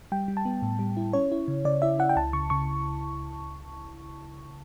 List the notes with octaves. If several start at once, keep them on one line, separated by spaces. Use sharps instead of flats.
G3 G5
G3
A5
B3
A2
G3
E4
C#4 C#5
E4
C#3
C#3 D5
E4 E5
E4 F#5
G5
C#2 A5
C#3 C#6
C#3 C#6